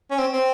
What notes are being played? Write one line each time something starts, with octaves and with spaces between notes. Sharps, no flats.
C#4
C4
C4